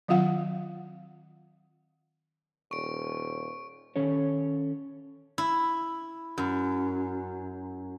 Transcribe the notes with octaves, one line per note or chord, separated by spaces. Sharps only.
D#3 F#3 C4 F4 F5 F#5
D#1 C#6 D7
D#3 C#4 A4 C#5
E4
F#2